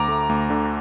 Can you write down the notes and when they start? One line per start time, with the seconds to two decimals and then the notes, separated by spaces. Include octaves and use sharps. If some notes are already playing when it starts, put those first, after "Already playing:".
Already playing: D2 A#5 D6
0.08 A3
0.29 D2
0.50 D3